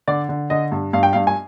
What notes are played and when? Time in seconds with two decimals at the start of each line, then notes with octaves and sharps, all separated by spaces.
0.08 D3 D5
0.29 D3
0.50 D3 D#5
0.72 G2
0.93 G2 F5
1.03 G5
1.13 G2 F5
1.27 G#5